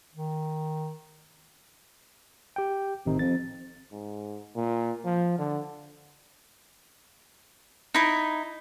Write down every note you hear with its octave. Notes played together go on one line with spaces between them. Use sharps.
D#3
G4 G5
A1 C3 D#3 D#4
F2 A6
G#2
A#2
F3
D3
D#4 E4